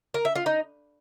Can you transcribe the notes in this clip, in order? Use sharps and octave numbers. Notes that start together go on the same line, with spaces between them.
A#4
E5
F4
D#4